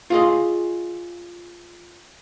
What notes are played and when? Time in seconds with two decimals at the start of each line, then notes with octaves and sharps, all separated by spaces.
0.10 F4 G#4 D#5